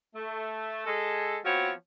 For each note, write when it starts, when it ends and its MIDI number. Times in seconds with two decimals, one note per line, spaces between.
0.14 0.82 57
0.85 1.37 56
0.85 1.37 68
0.85 1.37 69
1.44 1.70 53
1.44 1.70 59
1.44 1.70 60
1.44 1.70 66
1.44 1.70 73